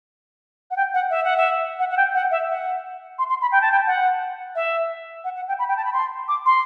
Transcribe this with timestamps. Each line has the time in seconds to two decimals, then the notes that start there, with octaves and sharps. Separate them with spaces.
0.71 F#5
0.77 G5
0.94 F#5
1.10 E5
1.24 F#5
1.37 E5
1.79 F#5
1.91 F#5
1.97 G5
2.15 F#5
2.31 E5
2.50 F#5
3.19 C6
3.29 C6
3.42 B5
3.52 G5
3.62 A5
3.72 G5
3.87 F#5
4.56 E5
5.24 F#5
5.36 F#5
5.48 G5
5.59 B5
5.69 G5
5.77 A5
5.85 B5
5.93 C6
6.28 D6
6.46 C6